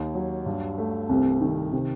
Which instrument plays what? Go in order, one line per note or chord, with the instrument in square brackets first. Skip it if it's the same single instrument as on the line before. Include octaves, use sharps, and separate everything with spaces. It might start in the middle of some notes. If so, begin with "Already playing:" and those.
Already playing: [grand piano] D#2 D#4
F#3
G2
A3
[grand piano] C2 [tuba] C4
[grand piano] D#3
C3